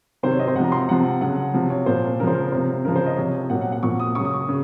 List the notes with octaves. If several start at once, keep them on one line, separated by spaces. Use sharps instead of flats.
C3 D#3 F#3 C5
C#5
D#5
C5
C3 F3 F#5 A#5
C6
A#5
C3 F3 F#5
C#3 F#3 F#5
C3 F3
C#5
A#2 F3 C5
C#3 F3 A#4 C5
A#4
C3 F3 C5
C#3 F3 A#4
C5
D#5
C3 F3 C#5
A#2 F#3 F#5
F#5
F#5
A#2 F3 C#6
D#6
C#3 F#3 C#6
D#6
C#6
C#3